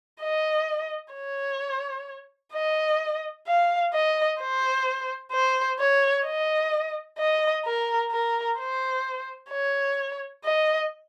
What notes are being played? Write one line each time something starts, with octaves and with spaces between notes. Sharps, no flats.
D#5
C#5
D#5
F5
D#5
C5
C5
C#5
D#5
D#5
A#4
A#4
C5
C#5
D#5